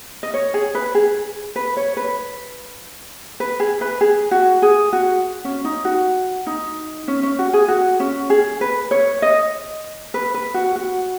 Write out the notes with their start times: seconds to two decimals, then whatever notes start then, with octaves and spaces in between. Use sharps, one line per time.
0.23 D#5
0.34 C#5
0.54 G#4
0.75 B4
0.95 G#4
1.56 B4
1.77 C#5
1.97 B4
3.40 B4
3.60 G#4
3.81 B4
4.01 G#4
4.31 F#4
4.62 G#4
4.93 F#4
5.44 C#4
5.64 D#4
5.85 F#4
6.47 D#4
7.08 C#4
7.23 C#4
7.39 F#4
7.53 G#4
7.68 F#4
8.00 C#4
8.30 G#4
8.61 B4
8.91 C#5
9.22 D#5
10.14 B4
10.34 B4
10.54 F#4
10.76 F#4